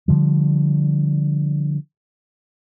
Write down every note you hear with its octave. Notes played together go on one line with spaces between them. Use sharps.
D3 F3 G3